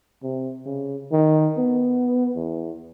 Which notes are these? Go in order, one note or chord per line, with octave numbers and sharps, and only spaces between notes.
C3
C#3
D#3
B3
E2